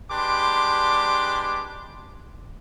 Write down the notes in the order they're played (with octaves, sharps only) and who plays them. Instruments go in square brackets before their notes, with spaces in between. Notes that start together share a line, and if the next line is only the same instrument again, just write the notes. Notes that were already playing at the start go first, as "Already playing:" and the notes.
[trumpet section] G#3 D4 G4 B4 C6 D6